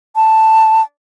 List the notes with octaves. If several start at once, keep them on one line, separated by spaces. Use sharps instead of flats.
A5